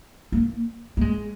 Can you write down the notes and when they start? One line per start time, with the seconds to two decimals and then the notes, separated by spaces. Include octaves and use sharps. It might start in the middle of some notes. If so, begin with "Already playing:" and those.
0.32 A#3
0.97 A#3
1.01 G#3